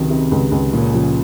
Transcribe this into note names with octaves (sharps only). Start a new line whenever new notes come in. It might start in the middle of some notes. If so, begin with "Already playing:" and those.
Already playing: C#2 C3 D#3 F#3
C3
C#2
C#2
A#2 C#3
F3